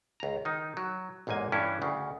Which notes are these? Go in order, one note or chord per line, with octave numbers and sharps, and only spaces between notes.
C#2 A#5
D#3 D#4
F#3
A1 E2 G#2 A#3 G#5
G2 E3 C#4 D4 E4
D2 C#3